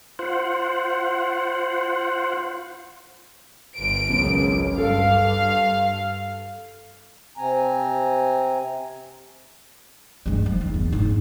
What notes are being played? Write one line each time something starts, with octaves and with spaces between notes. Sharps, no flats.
F4 C5 F#5
G1 D7
G#1 C#2 F#2
G2 A4 F5
C3 C4 G#5 A#5
G2 G#3
F3
D#2
E2
G#2 D3